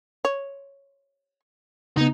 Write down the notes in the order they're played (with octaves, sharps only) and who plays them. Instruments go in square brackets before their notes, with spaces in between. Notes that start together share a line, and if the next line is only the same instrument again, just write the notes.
[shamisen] C#5
[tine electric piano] C#3 B3 [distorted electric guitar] D#4